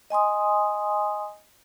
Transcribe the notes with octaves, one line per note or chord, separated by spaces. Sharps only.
D#5 G#5 C6 D#6